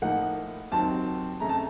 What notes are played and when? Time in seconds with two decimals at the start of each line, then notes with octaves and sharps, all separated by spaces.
0.02 A2 F3 A#3 D#4 F#5
0.72 D#2 D#3 F#3 C4 A5
1.40 F2 C#3 A3 A#5
1.49 A5